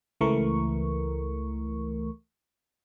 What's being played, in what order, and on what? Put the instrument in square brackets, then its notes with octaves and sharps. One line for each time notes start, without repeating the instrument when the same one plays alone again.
[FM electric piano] C#2 E3 A3 A#4 C#6